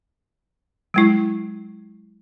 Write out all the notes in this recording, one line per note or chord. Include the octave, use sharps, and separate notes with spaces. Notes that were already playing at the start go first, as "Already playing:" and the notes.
F#3 G#3 E4